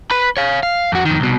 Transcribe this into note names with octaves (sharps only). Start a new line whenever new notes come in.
B4 B5
C#5 F5
F5
F2 F#4
F2 D#3
C2 B2